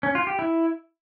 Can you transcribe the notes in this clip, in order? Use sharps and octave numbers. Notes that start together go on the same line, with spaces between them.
C#4
F4
G4
E4